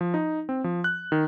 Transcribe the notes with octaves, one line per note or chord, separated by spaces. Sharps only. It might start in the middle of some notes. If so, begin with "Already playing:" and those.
F3
D#4
C4
F3
F#6
D#3